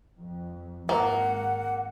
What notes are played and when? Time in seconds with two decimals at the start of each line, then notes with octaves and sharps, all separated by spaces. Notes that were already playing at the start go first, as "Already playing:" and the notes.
0.21 F2
0.89 G#1 A#3 F#5